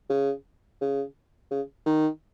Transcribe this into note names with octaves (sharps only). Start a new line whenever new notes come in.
C#3
C#3
C#3
D#3